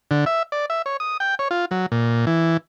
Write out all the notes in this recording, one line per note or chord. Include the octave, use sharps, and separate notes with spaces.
D3
E5
D5
E5
C#5
D#6
G5
C#5
F4
F#3
A#2
E3